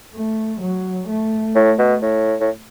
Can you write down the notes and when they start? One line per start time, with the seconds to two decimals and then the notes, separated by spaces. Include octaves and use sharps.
0.15 A3
0.61 F#3
1.08 A3
1.55 A2
1.78 B2
2.02 A2
2.40 A2